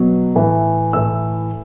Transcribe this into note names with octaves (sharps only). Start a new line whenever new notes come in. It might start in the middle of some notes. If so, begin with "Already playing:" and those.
Already playing: B2 F#3
A2 E3
A2 E3 E6